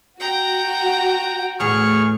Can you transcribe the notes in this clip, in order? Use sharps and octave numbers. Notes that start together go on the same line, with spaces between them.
F#4 G5 A#5
E2 A2 A3 G#4 C#6 F6